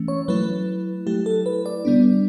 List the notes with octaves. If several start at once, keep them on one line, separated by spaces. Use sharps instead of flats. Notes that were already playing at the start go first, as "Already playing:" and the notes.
Already playing: E3 A3 C#4
C#5
F#3 A3 E4 B4
F#3 A3 E4 G4
A4
B4
D5
D3 G3 B3 D4